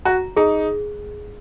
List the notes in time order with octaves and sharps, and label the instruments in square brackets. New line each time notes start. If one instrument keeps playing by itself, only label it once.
[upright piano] F#4 [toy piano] A#5
[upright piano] D#4 [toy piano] G#4